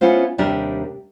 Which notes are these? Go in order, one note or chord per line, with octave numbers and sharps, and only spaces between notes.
B3 C#4 E4 F4 C5
D#2 C3 G3 D4 G4 A#4